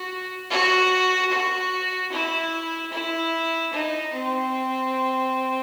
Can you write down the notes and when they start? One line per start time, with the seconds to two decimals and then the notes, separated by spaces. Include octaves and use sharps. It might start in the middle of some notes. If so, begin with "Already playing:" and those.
Already playing: F#4
0.51 F#4
1.31 F#4
2.12 E4
2.92 E4
3.73 D#4
4.14 C4